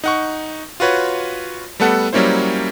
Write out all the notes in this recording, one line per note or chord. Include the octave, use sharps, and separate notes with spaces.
D#4 F#5 C#6
F4 F#4 B4 C#5
G3 A3 B3 A4 F#5
F#3 G3 A#3 C#4 E4 C5